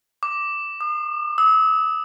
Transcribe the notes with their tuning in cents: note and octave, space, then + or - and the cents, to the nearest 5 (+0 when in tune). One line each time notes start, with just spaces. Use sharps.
D6 +0
D#6 -45
E6 -40